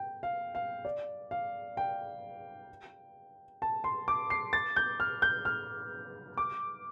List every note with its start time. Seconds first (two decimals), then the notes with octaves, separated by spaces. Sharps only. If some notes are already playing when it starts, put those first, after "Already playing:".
Already playing: G5
0.23 F5
0.55 F5
0.85 D5
1.31 F5
1.77 G5
3.62 A5
3.84 C6
4.08 D6
4.30 C7
4.53 A6
4.76 G6
5.00 F6
5.22 G6
5.45 F6
6.38 D6